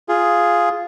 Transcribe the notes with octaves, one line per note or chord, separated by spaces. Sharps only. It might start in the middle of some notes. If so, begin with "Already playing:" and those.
F4 G#4